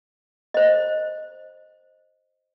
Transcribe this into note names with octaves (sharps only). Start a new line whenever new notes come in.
C5 D#5